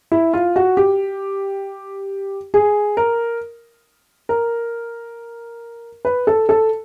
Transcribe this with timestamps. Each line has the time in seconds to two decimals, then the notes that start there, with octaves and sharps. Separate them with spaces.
0.12 E4
0.34 F4
0.56 F#4
0.77 G4
2.54 G#4
2.97 A#4
4.29 A#4
6.05 B4
6.27 A4
6.49 A4